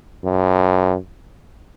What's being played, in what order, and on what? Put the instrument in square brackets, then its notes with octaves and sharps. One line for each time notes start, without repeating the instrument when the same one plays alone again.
[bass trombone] F#2